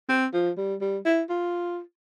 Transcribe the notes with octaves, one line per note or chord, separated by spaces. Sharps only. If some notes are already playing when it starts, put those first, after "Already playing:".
C4
F3
G3
G3
E4
F4